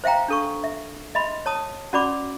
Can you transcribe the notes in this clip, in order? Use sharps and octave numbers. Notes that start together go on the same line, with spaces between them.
C5 E5 F5 G5 A#5
D4 A4 C#6
E5
D#5 E5 B5 C6
C#5 A5 D#6
C#4 F#4 D5 B5 D6